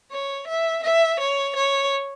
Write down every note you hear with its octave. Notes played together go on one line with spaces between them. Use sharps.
C#5
E5
E5
C#5
C#5